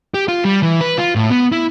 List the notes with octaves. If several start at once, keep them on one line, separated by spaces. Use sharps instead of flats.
G4
F4
G3
E3
B4
F4
A2
B3
E4